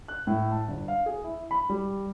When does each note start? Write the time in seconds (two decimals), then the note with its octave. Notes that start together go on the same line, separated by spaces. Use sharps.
0.08 F#6
0.27 A2
0.51 A5
0.68 G1
0.88 F5
1.06 G#4
1.24 E4
1.51 B5
1.69 G3